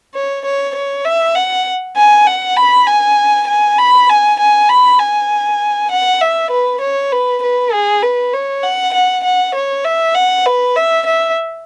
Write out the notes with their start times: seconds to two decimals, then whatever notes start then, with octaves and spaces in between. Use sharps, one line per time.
0.14 C#5
0.45 C#5
0.75 C#5
1.05 E5
1.35 F#5
1.97 G#5
2.26 F#5
2.57 B5
2.87 G#5
3.47 G#5
3.79 B5
4.09 G#5
4.39 G#5
4.69 B5
4.99 G#5
5.91 F#5
6.21 E5
6.51 B4
6.81 C#5
7.12 B4
7.43 B4
7.72 G#4
8.02 B4
8.33 C#5
8.63 F#5
8.93 F#5
9.24 F#5
9.55 C#5
9.85 E5
10.15 F#5
10.46 B4
10.76 E5
11.06 E5